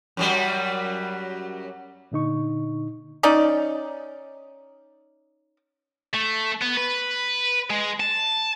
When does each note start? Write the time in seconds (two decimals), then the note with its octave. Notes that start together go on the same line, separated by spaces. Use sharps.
0.17 F#2 F#3 G3
2.12 A#2 D3 D#4 C#6
3.23 C#4 D#4 D5
6.14 A3
6.61 B3
6.77 B4
7.70 G#3
8.00 A5